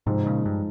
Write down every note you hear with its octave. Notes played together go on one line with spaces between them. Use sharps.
G#2 C3 F3 G#3 D#4
A#2 C#3
G2